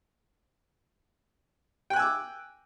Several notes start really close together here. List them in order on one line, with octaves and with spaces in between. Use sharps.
G5 F#6 G#5 E6 D6